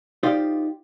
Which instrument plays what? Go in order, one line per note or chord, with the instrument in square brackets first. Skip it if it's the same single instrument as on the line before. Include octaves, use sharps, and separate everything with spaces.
[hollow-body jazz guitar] D#4 F4 G4 C5 D5 D#5